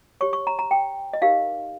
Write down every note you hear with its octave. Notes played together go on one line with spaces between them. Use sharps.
G4 C#5 C#6
C#6
A#5
A#5
G5
D#5
D#4 G4 A#4 F5